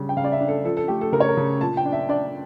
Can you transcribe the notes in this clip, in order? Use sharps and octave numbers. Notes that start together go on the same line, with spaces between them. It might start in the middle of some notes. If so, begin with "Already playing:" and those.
Already playing: C#3 G3
G5
C#3 F5
D5
E5
D4
A4
F3 A4
A4
A3 G4
A4
C#3 A#4
C#5
A#4
C#3
A#2 A5
G5
D4
E5
D4 D5